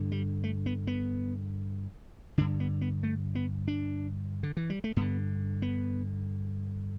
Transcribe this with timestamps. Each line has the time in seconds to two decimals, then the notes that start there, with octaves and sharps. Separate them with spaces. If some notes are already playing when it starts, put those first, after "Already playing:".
Already playing: G2 D3
0.12 G3
0.44 A3
0.66 B3
0.87 B3
2.38 G2 D3 D4
2.60 B3
2.81 B3
3.03 A3
3.35 B3
3.68 D4
4.43 D3
4.57 E3
4.70 G3
4.84 A3
4.96 G2 D3 B3
5.62 B3